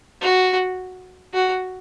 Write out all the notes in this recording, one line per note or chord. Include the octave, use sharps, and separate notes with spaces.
F#4
F#4